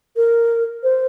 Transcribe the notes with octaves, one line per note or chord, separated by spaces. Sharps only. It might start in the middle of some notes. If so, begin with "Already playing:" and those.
A#4
C5